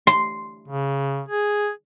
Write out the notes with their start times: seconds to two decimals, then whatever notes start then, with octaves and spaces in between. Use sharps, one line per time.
0.07 C6
0.68 C#3
1.29 G#4